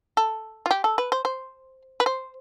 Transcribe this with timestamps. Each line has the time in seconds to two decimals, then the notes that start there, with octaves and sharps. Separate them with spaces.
0.17 A4
0.66 F4
0.71 G4
0.84 A4
0.98 B4
1.12 C5
1.25 C5
2.00 B4
2.06 C5